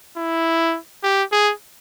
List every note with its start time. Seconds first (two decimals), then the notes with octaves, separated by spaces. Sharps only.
0.17 E4
1.04 G4
1.32 G#4